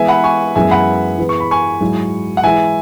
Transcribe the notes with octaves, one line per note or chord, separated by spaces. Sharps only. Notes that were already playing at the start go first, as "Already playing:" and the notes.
Already playing: E3 G#3 B3 G#4 E5 G#5
F#5 B5
G#5 C#6
F#2 E3 G#3 B3 G#4 E5 G#5
F#5 B5
E3 B3 G#4
C#6
B5
G#5 C#6
G#2 F#3 E4 G#4
F#5
E3 G#3 E4 E5 G#5